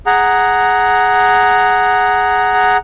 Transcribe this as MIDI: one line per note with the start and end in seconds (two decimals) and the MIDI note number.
0.06 2.77 68
0.06 2.77 78
0.06 2.77 82